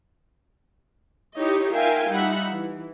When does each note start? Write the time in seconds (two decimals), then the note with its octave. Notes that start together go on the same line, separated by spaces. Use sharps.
1.36 D#4 E4 G4 C#5 D#5
1.70 F4 A#4 E5 F5 G5 G#5
2.10 G3 D#4 F4 E5 F#5 B5
2.51 E3